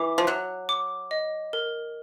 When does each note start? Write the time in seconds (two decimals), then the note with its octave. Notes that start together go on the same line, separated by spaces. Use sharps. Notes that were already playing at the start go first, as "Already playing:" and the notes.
Already playing: E3 D6
0.18 F3
0.27 F#3 F#6
0.69 D6
1.11 D#5
1.53 A#4